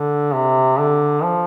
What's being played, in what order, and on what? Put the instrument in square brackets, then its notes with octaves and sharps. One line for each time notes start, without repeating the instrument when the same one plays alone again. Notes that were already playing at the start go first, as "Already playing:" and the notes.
Already playing: [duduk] D3
C3
D3
F3